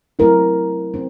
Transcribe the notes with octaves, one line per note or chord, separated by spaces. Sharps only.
F#3 A3 C4 E4 A#4
C4